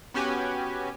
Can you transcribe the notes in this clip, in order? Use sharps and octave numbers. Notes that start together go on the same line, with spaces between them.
B3 C#4 F#4 G4 B4 G#5